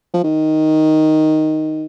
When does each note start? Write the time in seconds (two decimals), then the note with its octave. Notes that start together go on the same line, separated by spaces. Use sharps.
0.14 F3
0.24 D#3